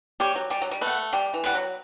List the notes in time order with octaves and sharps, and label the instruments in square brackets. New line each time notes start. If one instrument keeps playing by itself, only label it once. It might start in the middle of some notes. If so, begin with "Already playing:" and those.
[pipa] G3 [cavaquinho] G4 C#5
[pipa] F#3
[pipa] G3 [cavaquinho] G4
[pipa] F#3
G3
[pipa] A3 [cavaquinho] B4
[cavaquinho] F#5
[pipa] G3 [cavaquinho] G4
[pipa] E3
[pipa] G3 [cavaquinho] B4 F#5
[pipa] F#3